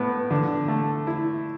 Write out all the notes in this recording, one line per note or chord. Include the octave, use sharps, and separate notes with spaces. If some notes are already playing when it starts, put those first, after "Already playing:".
Already playing: A2 B3
D3
A3
E4